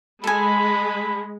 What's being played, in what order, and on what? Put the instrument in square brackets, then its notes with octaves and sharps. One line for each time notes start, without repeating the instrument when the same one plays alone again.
[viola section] G#3 [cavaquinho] A4 G#5 [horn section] B5